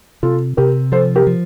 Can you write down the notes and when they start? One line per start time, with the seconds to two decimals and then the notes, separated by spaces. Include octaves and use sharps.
0.23 C3 F4 A4
0.57 C3 G4 A#4
0.92 F3 A4 C5
1.16 G4 A#4
1.27 F3